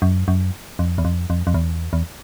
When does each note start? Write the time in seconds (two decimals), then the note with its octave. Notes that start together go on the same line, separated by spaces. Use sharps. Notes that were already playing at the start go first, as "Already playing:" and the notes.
0.02 F#2
0.28 F#2
0.79 F2
0.98 E2
1.05 F2
1.30 F2
1.47 F2
1.54 E2
1.93 E2